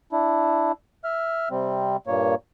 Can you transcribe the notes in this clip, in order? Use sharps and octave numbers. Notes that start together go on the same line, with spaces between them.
D4 E4
E5 F6
C3 G3 C4
G2 A#2 A#3 C#5